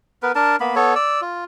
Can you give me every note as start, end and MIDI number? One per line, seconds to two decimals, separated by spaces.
0.23 0.32 59
0.23 0.32 70
0.23 0.32 71
0.35 0.56 62
0.35 0.56 70
0.35 0.56 81
0.60 0.75 58
0.60 0.75 59
0.60 0.75 83
0.76 0.94 59
0.76 0.94 69
0.76 0.94 73
0.95 1.21 74
0.95 1.21 88
1.21 1.44 65